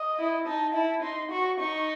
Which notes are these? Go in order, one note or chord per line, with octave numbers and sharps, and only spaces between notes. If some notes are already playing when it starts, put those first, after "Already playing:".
Already playing: D#5
E4
D#4 A5
E4 A5
D#4 C6
F#4 C#6
D#4 C#6